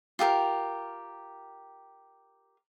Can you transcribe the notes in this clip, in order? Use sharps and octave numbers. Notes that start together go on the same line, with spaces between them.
F4 G4 A4 A#4